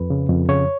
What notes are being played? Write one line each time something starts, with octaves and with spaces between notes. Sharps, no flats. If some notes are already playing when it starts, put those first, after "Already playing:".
Already playing: F2 B4
C#3
F2
C#3 C#5